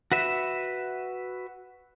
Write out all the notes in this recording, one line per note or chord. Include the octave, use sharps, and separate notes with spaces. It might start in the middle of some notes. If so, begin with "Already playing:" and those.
F#4 B4 E5